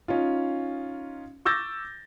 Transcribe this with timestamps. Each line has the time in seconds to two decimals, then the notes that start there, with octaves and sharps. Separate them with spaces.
0.08 C#4 D#4 F4
1.45 C#6 D6 E6 G6 A6 A#6